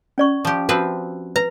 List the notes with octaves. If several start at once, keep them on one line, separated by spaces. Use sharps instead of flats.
C#4 D5 C#6
F3 G4
F3 C4 F#4 B4
B4 A#5